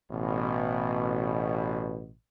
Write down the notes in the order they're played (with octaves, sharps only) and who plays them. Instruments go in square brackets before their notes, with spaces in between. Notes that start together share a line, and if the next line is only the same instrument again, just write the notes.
[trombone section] A1 B2